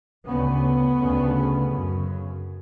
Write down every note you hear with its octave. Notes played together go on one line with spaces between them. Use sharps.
D2 C#3 B3
D2 C#3
F#2 C#3